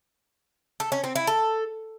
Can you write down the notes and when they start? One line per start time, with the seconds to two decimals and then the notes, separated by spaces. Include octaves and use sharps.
0.80 A4
0.92 C#4
1.04 C4
1.16 E4
1.27 A4